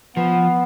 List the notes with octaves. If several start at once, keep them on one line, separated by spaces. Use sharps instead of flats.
F3 B3